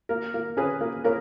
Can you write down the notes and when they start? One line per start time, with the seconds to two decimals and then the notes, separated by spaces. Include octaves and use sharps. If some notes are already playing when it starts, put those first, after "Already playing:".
0.09 A#3 A#4
0.34 A#3
0.57 C#4 G#4 B4
0.81 A#3
1.04 A#3 A#4 C#5